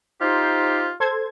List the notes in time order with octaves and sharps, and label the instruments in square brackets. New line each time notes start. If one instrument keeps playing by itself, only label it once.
[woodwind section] D#4 G4 C5 [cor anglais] F4
[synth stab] A4 C5 G#6